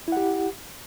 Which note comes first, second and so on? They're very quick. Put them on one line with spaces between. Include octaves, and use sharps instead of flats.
E4 F#5 G4